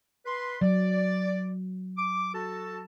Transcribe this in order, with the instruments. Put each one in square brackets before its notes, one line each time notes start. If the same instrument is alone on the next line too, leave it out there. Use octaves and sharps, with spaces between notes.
[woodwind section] B4 C6
[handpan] F#3 [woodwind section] D5
[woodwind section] D6
F#4 A4 A5